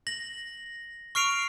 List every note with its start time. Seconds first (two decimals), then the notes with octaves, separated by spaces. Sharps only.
0.07 A#6 F#7
1.15 C#6 F6 C7 D7 F7